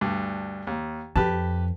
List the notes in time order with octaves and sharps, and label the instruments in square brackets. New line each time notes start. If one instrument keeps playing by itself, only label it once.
[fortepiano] D2 G2
D#2
[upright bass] F2 [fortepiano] G4 B4 A5